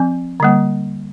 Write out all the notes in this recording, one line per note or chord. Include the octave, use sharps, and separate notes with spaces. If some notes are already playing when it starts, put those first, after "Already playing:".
Already playing: F3 C4
D3 G3 A#3